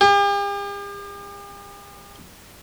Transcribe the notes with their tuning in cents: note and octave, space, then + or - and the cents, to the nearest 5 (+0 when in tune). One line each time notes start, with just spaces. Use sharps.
G4 +45